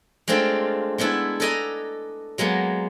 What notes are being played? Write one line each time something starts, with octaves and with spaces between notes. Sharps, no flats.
G#3 A3 C4 D4 F4
G#3 B3 D4 E4
A4 B4 D5 D#5 G#5 A#5
F#3 G#3 A#3 B3